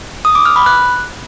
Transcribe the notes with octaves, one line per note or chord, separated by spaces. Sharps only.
D#6
D6
F6
B5
F#6